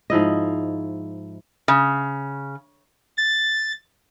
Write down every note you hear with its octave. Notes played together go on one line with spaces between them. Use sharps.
G#2 F3 E4 D#5
C#3
A6